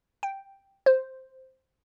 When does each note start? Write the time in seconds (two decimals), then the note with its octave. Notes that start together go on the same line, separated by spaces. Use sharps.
0.23 G5
0.86 C5